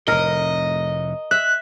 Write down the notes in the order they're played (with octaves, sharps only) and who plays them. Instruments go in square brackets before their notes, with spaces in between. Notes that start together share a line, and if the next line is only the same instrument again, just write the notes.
[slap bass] F1 A2 [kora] A#4 [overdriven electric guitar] D#5
[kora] E5 [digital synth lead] F#6